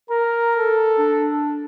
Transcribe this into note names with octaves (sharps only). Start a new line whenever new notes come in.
A#4 A#5
A4
D4